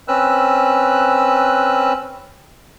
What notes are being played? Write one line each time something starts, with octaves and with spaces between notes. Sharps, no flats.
C4 C#4 B4 E6 F#6